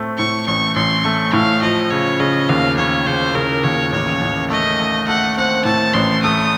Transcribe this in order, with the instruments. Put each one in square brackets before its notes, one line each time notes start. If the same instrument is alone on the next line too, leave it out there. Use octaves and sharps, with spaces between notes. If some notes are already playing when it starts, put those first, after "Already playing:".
Already playing: [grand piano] A2 A3 C4
[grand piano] A2 [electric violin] C#6
[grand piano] A1 [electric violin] C#6
[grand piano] A1 [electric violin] C6
[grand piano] A3 [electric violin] C#6
[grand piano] A2 [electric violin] F5
[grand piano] F3 [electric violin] D#5
[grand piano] C#3 [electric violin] C#5
[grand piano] C#3 [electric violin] D#5
[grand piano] D#2 [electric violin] F5
[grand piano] C#3 [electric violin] C#5
[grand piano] C#3 [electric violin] C5
[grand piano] C#3 [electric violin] A#4
[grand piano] D#2 [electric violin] C#5
[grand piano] A1 [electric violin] C#5
[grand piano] A1
[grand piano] A3 [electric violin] D#5
[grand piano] A3
[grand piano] A3 [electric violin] F#5
[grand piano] C4 [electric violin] F#5
[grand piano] A2 [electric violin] A5
[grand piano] A1 [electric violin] C6
[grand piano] A3 [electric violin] D#6